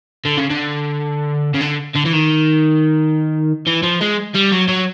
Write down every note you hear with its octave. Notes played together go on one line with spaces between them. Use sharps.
D3
C#3
D3
C#3
D3
D3
E3
D#3
E3
F3
G#3
G3
F#3
F#3